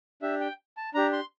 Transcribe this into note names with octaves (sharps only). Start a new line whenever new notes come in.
D4 G4 E5
G5
A5
D4 G4 A#5
C6